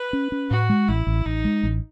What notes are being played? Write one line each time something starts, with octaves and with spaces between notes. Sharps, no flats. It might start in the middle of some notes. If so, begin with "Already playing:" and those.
Already playing: B4
C#4
C#4
A2 F#4
G#3
A1 E4
A1
A1 D#4
G#3
A1